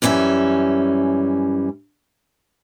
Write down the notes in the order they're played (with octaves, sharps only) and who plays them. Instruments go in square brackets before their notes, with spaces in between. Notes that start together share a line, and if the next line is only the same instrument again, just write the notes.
[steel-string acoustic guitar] F#2 E3 G3 C#4 E5